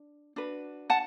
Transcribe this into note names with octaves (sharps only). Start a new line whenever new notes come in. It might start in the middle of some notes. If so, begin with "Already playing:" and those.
Already playing: D4
D4 F#4 B4
F#5 A5